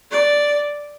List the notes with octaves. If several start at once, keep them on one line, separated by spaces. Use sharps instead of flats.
D5